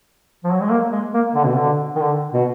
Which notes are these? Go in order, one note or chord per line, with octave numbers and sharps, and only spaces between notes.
F3
F#3
G#3
A#3
G#3
A#3
D3
B2
D3
D#3
D3
B2